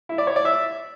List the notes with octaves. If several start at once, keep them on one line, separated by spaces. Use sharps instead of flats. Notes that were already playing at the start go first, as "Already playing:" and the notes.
E4
D5
C#5
D5
E5